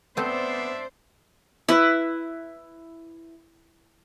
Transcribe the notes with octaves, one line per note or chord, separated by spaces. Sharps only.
A3 B3 C4 D4 C5 D5 E5
E4 B4